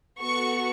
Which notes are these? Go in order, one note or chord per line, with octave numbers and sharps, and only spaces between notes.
B3 F#4 A4 C#6